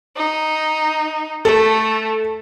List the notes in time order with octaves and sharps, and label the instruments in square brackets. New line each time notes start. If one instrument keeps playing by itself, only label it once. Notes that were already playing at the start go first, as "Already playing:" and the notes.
[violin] D#4
[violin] A3 [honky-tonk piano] A4